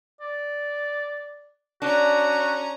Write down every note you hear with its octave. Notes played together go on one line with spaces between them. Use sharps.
D5
C#4 D4 F#4 A#5